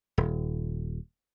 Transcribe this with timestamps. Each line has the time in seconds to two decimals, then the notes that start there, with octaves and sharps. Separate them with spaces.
0.18 D#1